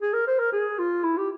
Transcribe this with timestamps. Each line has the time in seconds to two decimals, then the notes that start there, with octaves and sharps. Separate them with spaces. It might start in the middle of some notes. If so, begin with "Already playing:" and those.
0.02 G#4
0.14 A#4
0.28 C5
0.39 A#4
0.53 G#4
0.79 F4
1.04 E4
1.17 G4